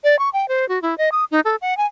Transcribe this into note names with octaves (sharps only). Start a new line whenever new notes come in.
D5
C#6
G5
C5
F#4
E4
D#5
D#6
D#4
A4
F#5
G#5